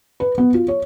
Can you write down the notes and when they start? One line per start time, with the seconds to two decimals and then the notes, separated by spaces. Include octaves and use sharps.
0.20 B4
0.38 B3
0.54 F4
0.68 C#5